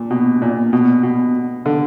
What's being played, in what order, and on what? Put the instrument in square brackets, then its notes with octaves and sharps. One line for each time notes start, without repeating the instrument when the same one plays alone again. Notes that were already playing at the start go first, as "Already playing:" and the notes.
Already playing: [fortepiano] A#2
B2
A#2
B2
B2
D3